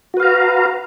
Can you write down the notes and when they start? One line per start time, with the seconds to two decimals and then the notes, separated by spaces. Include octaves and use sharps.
0.14 F#4
0.17 B4
0.20 F5
0.23 A#5